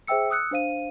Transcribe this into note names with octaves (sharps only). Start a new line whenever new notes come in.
G#4 C5 E5 G5 E6 C#7
D#6 E6 F#6 C#7
D4 C5 F5 D#7